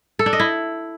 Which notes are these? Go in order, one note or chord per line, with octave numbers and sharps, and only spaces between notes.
A4
D4
D#5
E4